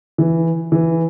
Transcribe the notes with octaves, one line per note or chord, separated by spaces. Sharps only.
E3
E3